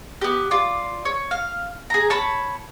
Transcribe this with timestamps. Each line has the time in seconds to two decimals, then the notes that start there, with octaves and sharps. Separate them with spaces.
0.22 B3 G4
0.51 F4 D5
1.05 C#5
1.31 F5
1.90 G#4 A#5
2.10 C#5 A5 B5